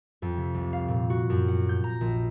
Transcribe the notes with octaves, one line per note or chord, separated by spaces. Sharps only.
F2
C3
C2
F5
A#2
F#4
F#2
F#5
G6
A#5
A#1